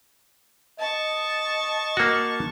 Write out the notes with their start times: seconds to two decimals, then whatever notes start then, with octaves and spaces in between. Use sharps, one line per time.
0.79 D#5 A5 C#6
1.97 A#3 F#4